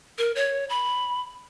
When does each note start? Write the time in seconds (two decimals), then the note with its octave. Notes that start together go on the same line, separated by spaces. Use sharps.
0.18 A#4
0.36 C#5
0.70 B5